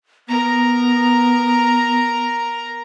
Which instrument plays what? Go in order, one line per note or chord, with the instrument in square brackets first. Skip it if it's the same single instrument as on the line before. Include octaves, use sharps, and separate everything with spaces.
[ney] B3 [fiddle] A#4 A#5